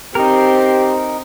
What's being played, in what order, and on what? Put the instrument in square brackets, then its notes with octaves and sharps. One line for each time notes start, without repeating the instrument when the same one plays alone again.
[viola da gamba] C4 C5 [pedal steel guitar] D#4 A#4 [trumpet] G4